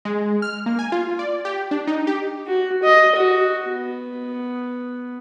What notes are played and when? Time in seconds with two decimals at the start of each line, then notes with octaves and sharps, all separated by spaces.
0.05 G#3
0.42 F6
0.66 A#3
0.79 G#5
0.92 F4
1.19 D5
1.45 G4
1.71 D4
1.87 D#4
2.07 G4
2.47 F#4
2.83 D#5
3.16 F#4
3.67 B3